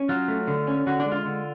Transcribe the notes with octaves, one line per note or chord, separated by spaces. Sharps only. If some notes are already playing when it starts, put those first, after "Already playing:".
Already playing: C#4
F#3 F4
A3
D3
C#4
D3 F#4
D4
G#3
F4
D3